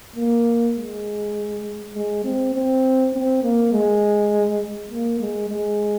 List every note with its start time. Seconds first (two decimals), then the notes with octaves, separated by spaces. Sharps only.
0.16 A#3
0.76 G#3
1.94 G#3
2.24 C4
2.54 C4
3.13 C4
3.43 A#3
3.73 G#3
4.91 A#3
5.20 G#3
5.50 G#3